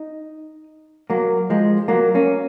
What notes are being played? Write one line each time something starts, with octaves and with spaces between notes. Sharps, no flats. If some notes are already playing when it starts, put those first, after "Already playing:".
Already playing: D#4
F#3 A#3
F3 G#3
F#3 A#3
A#3 C#4